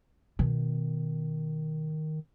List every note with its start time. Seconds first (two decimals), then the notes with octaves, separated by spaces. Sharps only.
0.39 B2 D#3